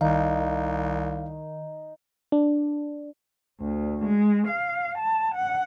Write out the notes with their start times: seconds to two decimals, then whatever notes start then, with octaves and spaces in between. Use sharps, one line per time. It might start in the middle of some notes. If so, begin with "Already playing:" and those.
0.01 C2 D#3 D#4 F5
2.32 D4
3.61 D2
4.06 G#3
4.48 F5
4.99 A5
5.36 F#5